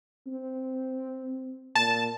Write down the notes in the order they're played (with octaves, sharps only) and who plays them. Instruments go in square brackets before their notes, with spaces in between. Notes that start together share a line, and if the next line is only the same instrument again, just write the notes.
[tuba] C4
[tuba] A#2 [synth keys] A5